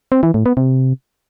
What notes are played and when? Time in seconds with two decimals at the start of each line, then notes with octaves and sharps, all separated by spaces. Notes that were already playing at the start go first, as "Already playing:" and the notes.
0.12 C4
0.23 E3
0.34 A2
0.46 B3
0.57 C3